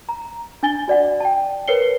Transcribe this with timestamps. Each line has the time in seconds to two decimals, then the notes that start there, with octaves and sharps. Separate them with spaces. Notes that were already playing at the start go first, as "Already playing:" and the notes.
0.09 A#5
0.63 D4 G#5 A6 G7
0.88 F#4 D5 F#5
1.20 G5 A5
1.68 A#4 B4 C#5 C7 C#7 G7